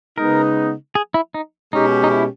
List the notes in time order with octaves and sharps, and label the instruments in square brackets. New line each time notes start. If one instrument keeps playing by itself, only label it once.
[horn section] C#3 G#3 B3 D#4 [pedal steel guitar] A#4
[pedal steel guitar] G#4
E4
D#4
[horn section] B2 G#3 C#4 G4 [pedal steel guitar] D#4
[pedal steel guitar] D#4
E4